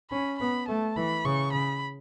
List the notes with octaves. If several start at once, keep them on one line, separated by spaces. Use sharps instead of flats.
C#4 B5
B3 B5
A3 A5
E3 B5
C#3 C#6
C#3 B5